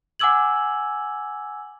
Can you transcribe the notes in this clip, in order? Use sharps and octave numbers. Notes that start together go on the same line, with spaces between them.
F#5 G#5 D6 E6 G#6 F#7